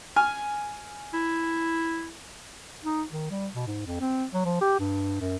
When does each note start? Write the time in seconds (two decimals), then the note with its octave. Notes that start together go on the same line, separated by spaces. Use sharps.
0.16 G#5 F6
1.13 E4
2.84 D#4
3.11 D#3
3.31 G3
3.54 B2
3.67 G#2
3.86 F2
4.00 C4
4.34 F#3
4.45 F3
4.61 G4
4.80 G2
5.21 F#2